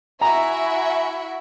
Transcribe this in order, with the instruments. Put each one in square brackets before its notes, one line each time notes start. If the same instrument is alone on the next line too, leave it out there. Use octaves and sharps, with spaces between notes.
[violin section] E4 F#4 E5 [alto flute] G#5 [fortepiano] A#5